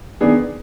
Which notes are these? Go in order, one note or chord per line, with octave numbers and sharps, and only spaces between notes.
D#3 B3 D4 G#4